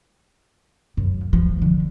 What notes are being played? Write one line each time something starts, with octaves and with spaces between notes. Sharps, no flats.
F#2
F3
D3